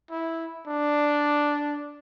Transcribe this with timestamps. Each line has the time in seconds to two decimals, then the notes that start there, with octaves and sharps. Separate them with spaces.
0.11 E4
0.67 D4